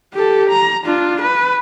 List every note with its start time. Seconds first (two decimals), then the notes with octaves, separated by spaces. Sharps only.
0.14 G4 A4
0.50 A#5
0.85 D4 F4
1.22 B4